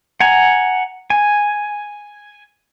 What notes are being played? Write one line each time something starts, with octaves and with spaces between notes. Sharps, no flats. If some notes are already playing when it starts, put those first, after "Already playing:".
F#5 G#5 A#5
G#5